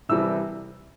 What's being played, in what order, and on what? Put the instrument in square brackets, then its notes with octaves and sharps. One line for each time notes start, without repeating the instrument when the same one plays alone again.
[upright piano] C2 C3 E3 G3 E6